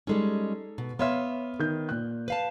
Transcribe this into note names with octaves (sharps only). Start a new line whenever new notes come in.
G3 G#3 C#4 D#4 G#4 A4
B2
B3 C#5 E5 F5 C6 F6
D#3 G6
A#2 F#6
B4 F5 A5